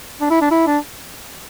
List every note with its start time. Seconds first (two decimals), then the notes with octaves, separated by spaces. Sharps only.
0.21 D4
0.30 E4
0.41 D4
0.51 E4
0.67 D4